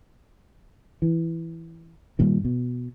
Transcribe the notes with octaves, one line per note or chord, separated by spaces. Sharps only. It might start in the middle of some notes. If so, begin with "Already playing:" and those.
E3
G2 A#2 D#3
B2